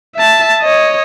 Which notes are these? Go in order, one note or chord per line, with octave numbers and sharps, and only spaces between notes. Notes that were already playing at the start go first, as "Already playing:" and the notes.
E5 A5
C#5 D#5